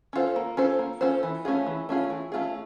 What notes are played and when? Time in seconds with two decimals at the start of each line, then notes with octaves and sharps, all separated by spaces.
0.13 C#4 F4 A4 C5
0.36 A#3
0.57 C#4 F4 A4 C5
0.79 A#3
1.01 C#4 F4 A4 C5
1.23 E3
1.45 A3 C#4 F4 G#4
1.67 E3
1.89 A3 C#4 F4 G#4
2.10 E3
2.32 A3 C#4 F4 G#4